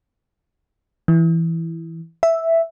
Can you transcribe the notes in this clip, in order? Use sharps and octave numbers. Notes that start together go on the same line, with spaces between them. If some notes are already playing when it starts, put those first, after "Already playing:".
E3
E5